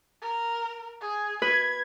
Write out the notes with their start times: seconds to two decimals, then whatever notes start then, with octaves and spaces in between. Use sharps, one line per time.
0.22 A#4
1.01 G#4
1.42 B4 G#6